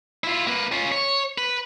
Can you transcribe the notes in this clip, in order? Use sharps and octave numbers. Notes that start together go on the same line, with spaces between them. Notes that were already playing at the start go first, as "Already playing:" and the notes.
E4 F4
A#3 B4
C#4 F4
C#5
B4